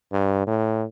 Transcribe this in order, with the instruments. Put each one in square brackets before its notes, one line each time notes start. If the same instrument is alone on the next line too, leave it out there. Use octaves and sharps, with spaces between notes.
[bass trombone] G2
A2